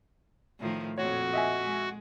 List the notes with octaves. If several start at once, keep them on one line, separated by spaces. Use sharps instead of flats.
A2 D#3 F3
F2 A#2 F#4 C#5
D#5 E5 G#5
G#3